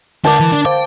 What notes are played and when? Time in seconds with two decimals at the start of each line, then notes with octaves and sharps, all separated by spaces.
0.25 D3 D4 F#4 A#4 A5 D6
0.40 E3
0.52 D4
0.65 C5 F5 G5 D6